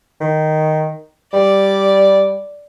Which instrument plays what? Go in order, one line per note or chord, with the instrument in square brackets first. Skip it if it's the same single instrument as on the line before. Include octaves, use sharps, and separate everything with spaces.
[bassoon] D#3
[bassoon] G3 [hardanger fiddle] D5